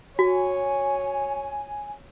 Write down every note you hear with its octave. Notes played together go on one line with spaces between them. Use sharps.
F#4 C#5 G#5